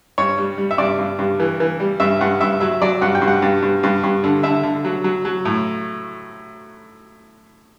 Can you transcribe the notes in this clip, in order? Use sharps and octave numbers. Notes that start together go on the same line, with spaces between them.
G2 C#5
G3
G3
E5
G2 D5
G2
G2
E3
E3
G3
G2 E5
G2 F#5
G2 E5
F#3 E5
F#3 D5
G2 F#5
G5
G2
F#5
G2
G2
G2
G2
D3
D3 E5
D3
F#3
F#3
F#3
A2